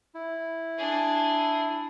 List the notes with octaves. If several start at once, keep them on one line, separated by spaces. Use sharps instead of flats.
E4
D4 G#4